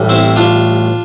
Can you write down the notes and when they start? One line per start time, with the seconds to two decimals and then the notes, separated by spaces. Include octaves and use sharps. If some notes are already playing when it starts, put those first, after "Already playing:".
Already playing: A1 A2 G3
0.09 C4 E4
0.36 D4 F4